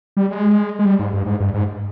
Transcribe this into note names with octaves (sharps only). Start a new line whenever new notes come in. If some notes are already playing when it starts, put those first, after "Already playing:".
G3
G#3
G#3
G3
G#2
G2
G#2
G2
G#2